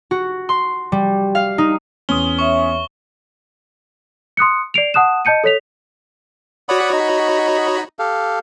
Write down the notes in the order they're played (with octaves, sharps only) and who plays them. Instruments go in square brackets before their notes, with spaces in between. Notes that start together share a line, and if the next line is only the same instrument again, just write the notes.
[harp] F#4
C6
G3
F5
D#4
[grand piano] E2 C6 [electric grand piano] C#4 D#6 [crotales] G7
[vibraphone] C#5 E5 [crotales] C#6
[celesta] C6 D#6 F#6 C#7
D5 C7 D7 F7
F#5 A5 D#6 F#6 E7
D#5 A5 G6 C#7 D#7
A4 C#5 B6 F7
[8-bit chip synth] F#4 C#5 B5 [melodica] D5 F#5 D#6
[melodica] D#4 D#5
G4 A4 F5